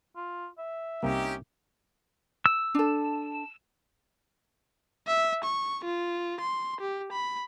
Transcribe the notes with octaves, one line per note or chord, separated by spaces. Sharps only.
F4
E5
C2 C3 A#3 C#4 D#4 G4
E6
D4 A4
E5
C#6
F4
C6
G4
B5